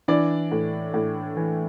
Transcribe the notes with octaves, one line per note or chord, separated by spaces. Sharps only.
E3 D4 D5
A2
A2
E3